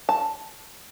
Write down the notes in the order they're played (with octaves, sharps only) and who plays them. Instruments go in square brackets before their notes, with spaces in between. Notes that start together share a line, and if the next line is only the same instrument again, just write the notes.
[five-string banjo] A5